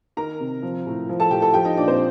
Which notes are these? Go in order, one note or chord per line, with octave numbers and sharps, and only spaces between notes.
D#3 A#4 A#5
C3
F3
A2
F3
A4 A5
A2 G4 G5
A4 A5
F3 G4 G5
D#4 D#5
A#2 D4 D5
C4 C5